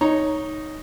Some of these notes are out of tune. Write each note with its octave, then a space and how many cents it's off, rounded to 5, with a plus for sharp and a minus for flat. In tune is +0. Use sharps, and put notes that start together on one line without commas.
D#4 +0 C#5 +0 A#5 +0